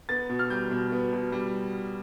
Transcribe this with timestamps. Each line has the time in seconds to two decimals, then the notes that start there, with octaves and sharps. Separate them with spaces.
0.09 B3 A6
0.29 B2
0.39 F6
0.50 G3 G6
0.71 B2
0.92 B3
1.13 B2
1.32 G3